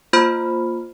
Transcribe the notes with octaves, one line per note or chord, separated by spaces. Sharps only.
A#3 F4 C5 B5 F6